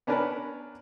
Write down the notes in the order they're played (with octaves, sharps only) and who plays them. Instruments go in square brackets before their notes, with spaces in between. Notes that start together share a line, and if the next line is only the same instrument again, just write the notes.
[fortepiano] B3 C#4 D4 A#4 B4 A5